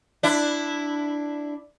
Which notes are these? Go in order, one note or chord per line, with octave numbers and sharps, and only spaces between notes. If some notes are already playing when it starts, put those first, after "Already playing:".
D4 E4